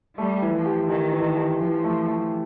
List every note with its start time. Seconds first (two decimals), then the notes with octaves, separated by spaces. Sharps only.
0.18 G3 A3
0.42 E3
0.54 F3
0.66 G4
0.89 D#3 G4
1.13 E3
1.37 G4
1.60 E3 F3
1.84 A3
2.08 A3